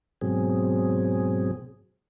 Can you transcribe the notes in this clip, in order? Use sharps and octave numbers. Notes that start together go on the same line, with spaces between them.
G#2 B2 F#3 C4 G#4